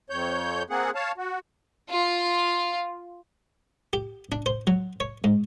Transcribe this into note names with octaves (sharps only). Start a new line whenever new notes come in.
F2 C#5 G6
A#3 C4 G#4 F#5
C#5 F5 A5
F#4
F4
G4
D4
C5
F#3
C#5
G#2